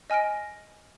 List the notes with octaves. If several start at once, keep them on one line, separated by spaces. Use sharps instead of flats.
D#5 G#5 F6 A#6 D7